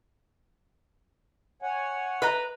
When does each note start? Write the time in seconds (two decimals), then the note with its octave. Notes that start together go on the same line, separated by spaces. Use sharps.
1.62 C#5 F#5 G#5
2.22 B4 D#5 A#5